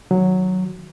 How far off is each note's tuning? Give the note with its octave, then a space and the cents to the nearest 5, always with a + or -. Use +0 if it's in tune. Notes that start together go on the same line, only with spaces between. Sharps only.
D#3 +0 F#3 +0